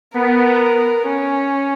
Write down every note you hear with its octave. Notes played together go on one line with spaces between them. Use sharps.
B3 A#4
C#4